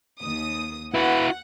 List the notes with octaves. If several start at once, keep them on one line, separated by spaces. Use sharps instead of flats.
D#2 D#6
E4 F#4 B4 F#5